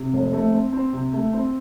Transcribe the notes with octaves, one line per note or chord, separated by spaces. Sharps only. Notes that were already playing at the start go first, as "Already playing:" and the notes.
Already playing: C3
F1
A3
C4
C4
C3
A3
C4